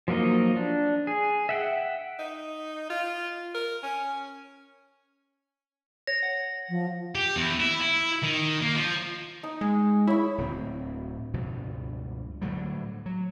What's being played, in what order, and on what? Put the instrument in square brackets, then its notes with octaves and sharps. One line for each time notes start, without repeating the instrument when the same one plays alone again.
[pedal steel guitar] F3 F#3 A#3 D#4 D#5
D4
G#4
E5 F#5 G5
[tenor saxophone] D#4
F4
A#4
C#4
[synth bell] C#5 [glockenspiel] A#6
[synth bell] F#5
[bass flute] F3
[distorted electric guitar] G4
E2
E4
E4
D#3
A#3
F3
[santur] D#4
[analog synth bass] G#3
[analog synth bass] E4 [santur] C#5 B5
[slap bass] D1 D2 A2 C4
C#2 G2 B2 F3
A2 D3 F#3 G3
F#3